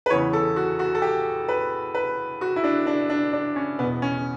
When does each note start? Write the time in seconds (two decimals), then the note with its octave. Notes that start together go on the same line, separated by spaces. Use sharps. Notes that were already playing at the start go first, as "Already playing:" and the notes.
0.06 B4
0.10 E2 C#3 E3 C#5
0.33 A4
0.56 F#4
0.79 F#4
0.95 A4
1.02 G4
1.49 B4
1.95 B4
2.41 F#4
2.56 E4
2.64 D4
2.87 D4
3.10 D4
3.33 D4
3.56 C#4
3.79 E2 B2 B3
4.02 C#4